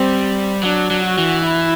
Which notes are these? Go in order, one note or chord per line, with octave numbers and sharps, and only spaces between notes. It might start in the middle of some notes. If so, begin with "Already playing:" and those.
Already playing: G3 C4
F#3 D4
F#3
F#4
E3
E4